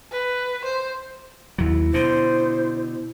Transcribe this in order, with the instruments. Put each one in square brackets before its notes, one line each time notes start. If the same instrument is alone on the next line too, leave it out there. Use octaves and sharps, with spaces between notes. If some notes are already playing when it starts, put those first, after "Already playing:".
[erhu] B4
C5
[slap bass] D#2 F#3 [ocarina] E4
[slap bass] B2 D3 [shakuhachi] C5